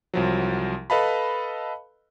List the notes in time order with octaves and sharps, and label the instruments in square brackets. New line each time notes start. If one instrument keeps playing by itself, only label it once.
[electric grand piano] C2 F3 F#3
A4 B4 D#5 F5 A5 B5